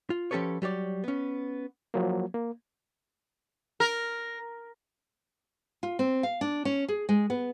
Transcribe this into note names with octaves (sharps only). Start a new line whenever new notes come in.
F4
F3 C#4 G4 A4 B4 C#5
F#3 G3 C#5 D5
B3 C#4
F3 F#3 A#3
A#3
A#4
F4
C4
F5
D4
C#4
G#4
G#3
B3